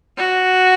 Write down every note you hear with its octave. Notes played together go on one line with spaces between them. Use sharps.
F#4